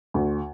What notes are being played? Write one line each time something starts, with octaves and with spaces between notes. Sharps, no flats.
D2